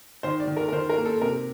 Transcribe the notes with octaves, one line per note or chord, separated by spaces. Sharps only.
D#3 C5
D5
D#3
A#4
A#4
D#3 C5
A#4
A#3
A4
C3 A#4